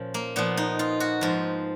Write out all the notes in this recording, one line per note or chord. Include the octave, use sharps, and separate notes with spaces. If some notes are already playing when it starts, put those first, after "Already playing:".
Already playing: A#2 F3 C#4
A#3
A#2 F3 B3
D#4
F4
F#4
G#2 F3 F4